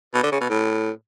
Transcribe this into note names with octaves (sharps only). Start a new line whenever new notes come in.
B2
D3
C#3
B2
A2